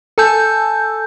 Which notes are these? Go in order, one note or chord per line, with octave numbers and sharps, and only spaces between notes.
A4 G#5 A5 E6 G6